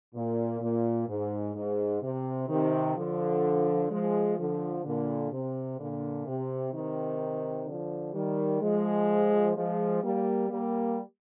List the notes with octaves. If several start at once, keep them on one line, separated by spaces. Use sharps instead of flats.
A#2
A#2
G#2
G#2
C3
C3 D#3
D3 F3
F3 G#3
D3 F3
A#2 D3
C3
A#2 D3
C3
C3 D#3
D3 F3
D#3 G3
F3 G#3
F3 G#3
G3 A#3
G3 A#3